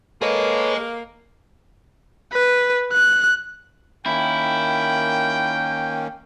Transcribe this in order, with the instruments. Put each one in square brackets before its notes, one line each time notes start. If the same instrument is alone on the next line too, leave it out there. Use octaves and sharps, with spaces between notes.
[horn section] A#3 [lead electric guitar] G#4 D#5 [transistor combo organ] A4 B4 C#5
[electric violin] B4
F#6
[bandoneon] D#3 A#3 C#4 [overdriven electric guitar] E4 [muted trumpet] G5